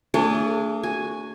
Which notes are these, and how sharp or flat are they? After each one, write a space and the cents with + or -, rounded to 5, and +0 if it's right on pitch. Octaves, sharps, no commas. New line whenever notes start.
A3 +35 D4 -25 G#4 +0
F#4 +0 G#5 +0